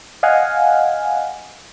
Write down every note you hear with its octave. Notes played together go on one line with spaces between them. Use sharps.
D#5 F5 F#5 G#5